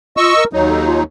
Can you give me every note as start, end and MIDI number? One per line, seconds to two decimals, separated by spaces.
0.17 0.33 65
0.17 0.44 75
0.17 0.44 85
0.17 0.44 88
0.36 0.47 70
0.53 1.03 39
0.53 1.03 54
0.53 1.03 63
0.53 0.65 73
0.68 0.82 69
0.85 1.00 65